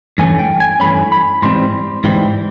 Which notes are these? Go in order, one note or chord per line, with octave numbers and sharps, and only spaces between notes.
G2 E3 A3 C#4 G#5
G5
G#5
G2 E3 A3 C#4 B5
B5
G#2 E3 G3 C4 C6
G#2 E3 G3 C4